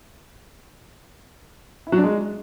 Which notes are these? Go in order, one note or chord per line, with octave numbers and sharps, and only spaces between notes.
E4
F#3
D4
G#3